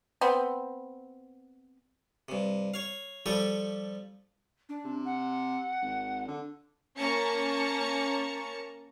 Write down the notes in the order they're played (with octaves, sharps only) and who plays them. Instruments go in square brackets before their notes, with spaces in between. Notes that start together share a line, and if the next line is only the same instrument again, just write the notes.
[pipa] B3 C4
[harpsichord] G2 C3
C#5 F5
F3 G3 G4 A4 C#6 D#6
[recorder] D4
[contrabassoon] C3
[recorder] F#5
[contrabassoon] G#1
D3
[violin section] A#3 C#4 A5 A#5 C#6 C#7